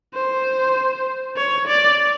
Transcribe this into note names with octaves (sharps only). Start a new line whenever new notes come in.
C5
C#5
D5